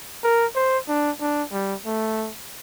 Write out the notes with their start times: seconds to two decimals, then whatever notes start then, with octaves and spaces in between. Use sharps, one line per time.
0.24 A#4
0.56 C5
0.88 D4
1.20 D4
1.52 G3
1.85 A3